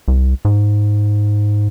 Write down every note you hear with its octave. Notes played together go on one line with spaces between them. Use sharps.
C2
G#2